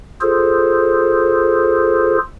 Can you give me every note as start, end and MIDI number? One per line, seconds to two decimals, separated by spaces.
0.21 2.18 65
0.21 2.18 68
0.21 2.18 69
0.21 2.18 72